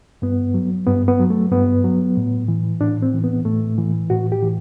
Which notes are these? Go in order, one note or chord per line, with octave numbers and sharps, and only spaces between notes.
G2 B3
F#3
G2 B3
B3
F#3
A3
G2 B3
F#3
A2
E3
A2 D4
C4
E3
B3
A2 A3
E3
A2 F#4
G4
E3